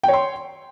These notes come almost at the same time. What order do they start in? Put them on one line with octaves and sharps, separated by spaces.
G5 C#5 C6